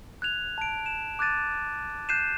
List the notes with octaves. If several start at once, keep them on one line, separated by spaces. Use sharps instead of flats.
F#6 G#6 F7
A5 D7
E7
D6 F#6 G#6 A6 D#7
F#6 G6 C7 D#7 E7